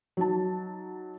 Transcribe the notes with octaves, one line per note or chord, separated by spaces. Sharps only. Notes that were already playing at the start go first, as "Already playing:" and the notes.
F#3 D#4 A5